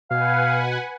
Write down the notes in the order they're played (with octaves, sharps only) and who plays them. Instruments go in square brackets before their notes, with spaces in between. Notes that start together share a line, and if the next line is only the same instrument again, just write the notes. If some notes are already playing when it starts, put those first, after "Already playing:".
[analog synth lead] B2 [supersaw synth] B4 F#5 G#5 [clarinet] F5